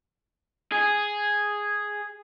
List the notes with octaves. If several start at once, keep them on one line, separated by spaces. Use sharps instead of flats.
G#4